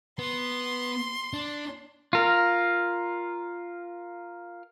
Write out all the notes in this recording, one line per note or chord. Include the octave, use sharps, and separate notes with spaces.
B3 C6
D4
F4 A#4